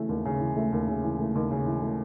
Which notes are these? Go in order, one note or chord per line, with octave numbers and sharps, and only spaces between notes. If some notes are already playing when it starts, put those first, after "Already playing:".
Already playing: C#3 E3 A3
D#2
C#3
E3
A3
D#2
C#3
E3
A3
D#2
C#3
E3
A3